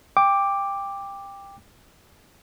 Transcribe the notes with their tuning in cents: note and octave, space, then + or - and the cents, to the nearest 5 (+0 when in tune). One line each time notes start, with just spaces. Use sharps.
G5 +20 D6 +0